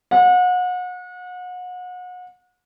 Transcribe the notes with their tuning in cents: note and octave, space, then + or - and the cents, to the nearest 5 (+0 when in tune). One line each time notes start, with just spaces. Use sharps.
F#5 -35